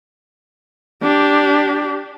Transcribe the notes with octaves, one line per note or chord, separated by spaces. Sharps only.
D4 G4